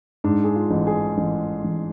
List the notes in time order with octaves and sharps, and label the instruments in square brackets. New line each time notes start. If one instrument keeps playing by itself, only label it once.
[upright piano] G#2 D4
G#4
F4
A1
G#4
A1
A1